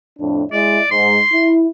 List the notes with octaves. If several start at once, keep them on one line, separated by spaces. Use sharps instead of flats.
F2 A2 D4
G#3 E4 D5 D#5
G#2 C6
E4